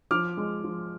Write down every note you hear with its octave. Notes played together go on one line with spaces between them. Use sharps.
F3 D6 F6
G#3
F3